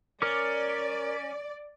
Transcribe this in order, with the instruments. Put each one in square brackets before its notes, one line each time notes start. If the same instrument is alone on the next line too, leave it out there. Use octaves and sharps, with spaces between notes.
[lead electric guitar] C#4 [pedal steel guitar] A#4 D6 [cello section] D5